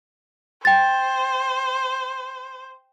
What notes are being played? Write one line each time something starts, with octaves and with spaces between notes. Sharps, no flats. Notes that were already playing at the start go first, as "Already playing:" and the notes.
C5 G5 A6